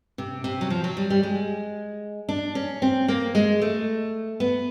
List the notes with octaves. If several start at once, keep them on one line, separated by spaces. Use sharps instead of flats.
C3
C3
F#3
F3
F#3
G3
G3
G#3
D4
C#4
C4
A#3
G#3
A3
B3